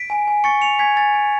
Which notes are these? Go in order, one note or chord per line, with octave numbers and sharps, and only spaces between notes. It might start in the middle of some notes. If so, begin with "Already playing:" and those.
Already playing: B6 D7
G#5
G#5
C#6 A6 C#7
G#5 C#7 F7
G#5 G#6 B6
G#5 A6
G#5